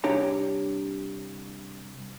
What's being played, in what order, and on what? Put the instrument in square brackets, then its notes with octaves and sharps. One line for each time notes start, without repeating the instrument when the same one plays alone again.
[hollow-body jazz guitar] C2 D4 G4 C#5 A#5